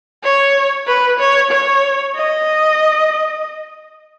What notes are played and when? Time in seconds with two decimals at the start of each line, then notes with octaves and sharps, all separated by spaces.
0.23 C#5
0.87 B4
1.19 C#5
1.51 C#5
2.16 D#5